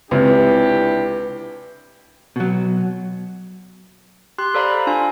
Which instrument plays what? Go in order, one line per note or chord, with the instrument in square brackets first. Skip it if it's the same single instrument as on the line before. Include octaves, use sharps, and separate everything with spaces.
[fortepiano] C#2 C3 [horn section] D4 E4 G4 [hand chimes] B4
[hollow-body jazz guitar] B2 F#3
[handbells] G4 C6 F#6
A4 C5 D5 F5 A#5 B5
D4 F4 F5 G#5